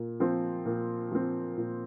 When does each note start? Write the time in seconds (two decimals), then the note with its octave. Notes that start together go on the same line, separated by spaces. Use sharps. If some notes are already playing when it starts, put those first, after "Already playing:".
Already playing: A#2
0.20 F3 C4
0.65 A#2
1.11 F3 C4
1.57 A#2